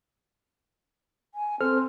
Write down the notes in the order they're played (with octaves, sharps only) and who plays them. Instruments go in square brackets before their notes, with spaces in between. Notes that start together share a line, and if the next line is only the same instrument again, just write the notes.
[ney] G#5
[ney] C4 [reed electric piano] A4 C5 F6